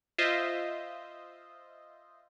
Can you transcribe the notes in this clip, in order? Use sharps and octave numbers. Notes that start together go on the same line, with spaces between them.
F4 C5 D#5 E5